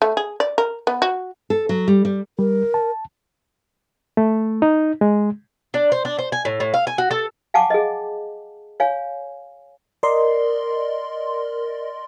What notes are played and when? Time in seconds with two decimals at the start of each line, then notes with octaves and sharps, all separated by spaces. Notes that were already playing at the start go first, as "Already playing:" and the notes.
0.02 A3
0.17 G#4
0.40 D5
0.58 A#4
0.87 B3
1.02 F#4
1.50 A4
1.69 F#3
1.88 G3
2.05 G3
2.39 G3 A#4
2.74 A5
4.17 A3
4.62 D#4
5.01 G#3
5.74 D4
5.92 C5
6.05 D4
6.19 C5
6.32 G#5
6.45 A2
6.60 A2
6.74 F5
6.87 G#5
6.98 F#4
7.11 A4
7.54 F5 F#5 G#5 A5 C#6 D6
7.70 G#4 D#5
8.80 C#5 F5 G#5
10.03 A#4 D5 D#5 C6